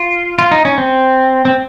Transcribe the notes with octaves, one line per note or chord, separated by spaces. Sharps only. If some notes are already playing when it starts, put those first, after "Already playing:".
Already playing: F4
F4
D#4
C#4
C4
C4